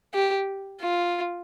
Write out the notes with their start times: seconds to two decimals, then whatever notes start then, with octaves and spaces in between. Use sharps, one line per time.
0.14 G4
0.81 F4